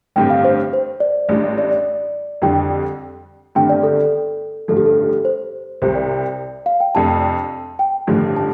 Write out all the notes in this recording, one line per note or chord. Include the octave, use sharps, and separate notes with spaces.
A1 G2 D3 G3 C4 G5
F5
C5
C5
D5
A1 A2 G3 D4
D5
D5
F2 D3 G3 D4 G5
G1 G2 D3 A3 C4 G5
D5
A4
A1 G2 D3 F3 A4
G4
A4
C5
C2 C3 G3 C5
D5
F5
G5
F2 C3 A3 D4 A5
G5
A1 G2 D3 F3 A3
A5